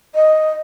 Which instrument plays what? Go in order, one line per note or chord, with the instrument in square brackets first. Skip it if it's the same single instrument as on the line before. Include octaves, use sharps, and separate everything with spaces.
[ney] D#5